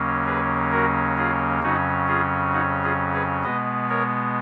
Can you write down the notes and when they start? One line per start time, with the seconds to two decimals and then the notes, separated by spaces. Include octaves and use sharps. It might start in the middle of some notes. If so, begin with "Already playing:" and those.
Already playing: D#2 C#3 F#3 A#3 C#4
0.26 G#4 B4
0.72 F#4 A#4
1.17 F4 G#4
1.63 F2 C#3 F#3 C#4 D#4 F#4
2.08 F4 G#4
2.53 D#4 F#4
2.84 F4 G#4
3.13 G#4 B4
3.43 B2 G#3 B3 B4 D#5
3.89 A#4 C#5